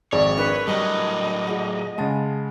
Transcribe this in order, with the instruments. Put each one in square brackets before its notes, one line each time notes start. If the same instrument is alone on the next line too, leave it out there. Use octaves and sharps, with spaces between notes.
[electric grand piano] G#1 F2 D5 [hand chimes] G#4 [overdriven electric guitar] C#5
[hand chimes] D4 A#4 C#7 [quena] B4
[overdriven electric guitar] A2 F#3 [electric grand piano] G3 [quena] D#5
[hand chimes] F4 G#4 F#5
[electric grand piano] C#3 G#3 [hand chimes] F#5 A5 A6